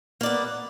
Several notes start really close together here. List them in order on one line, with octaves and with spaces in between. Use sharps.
A#3 D5 B3